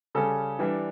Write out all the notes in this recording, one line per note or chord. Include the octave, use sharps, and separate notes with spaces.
C#3 G3 C#4 A4
E3 G3 D4